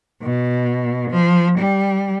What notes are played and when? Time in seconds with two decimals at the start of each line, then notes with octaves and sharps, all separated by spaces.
0.23 B2
1.11 F3
1.58 G3